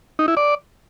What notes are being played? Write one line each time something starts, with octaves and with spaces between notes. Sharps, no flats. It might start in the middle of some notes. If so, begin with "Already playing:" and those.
D#4
E4
D5